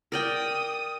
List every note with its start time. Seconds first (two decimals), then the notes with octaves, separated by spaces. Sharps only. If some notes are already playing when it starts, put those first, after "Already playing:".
0.12 A#4 D5 G5 D#6